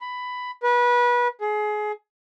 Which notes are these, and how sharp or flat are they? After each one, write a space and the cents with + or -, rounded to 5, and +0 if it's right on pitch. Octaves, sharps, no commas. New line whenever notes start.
B5 +10
B4 -25
G#4 +25